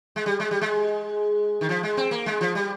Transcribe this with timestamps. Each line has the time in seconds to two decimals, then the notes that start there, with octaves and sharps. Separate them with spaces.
0.16 G#3
0.26 G3
0.40 G#3
0.51 G3
0.61 G#3
1.61 D#3
1.69 F3
1.83 G#3
1.97 C4
2.11 A#3
2.26 G#3
2.41 F3
2.55 G3